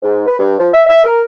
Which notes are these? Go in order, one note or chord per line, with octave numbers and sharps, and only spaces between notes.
G#2
B4
G2
F3
E5
E5
A#4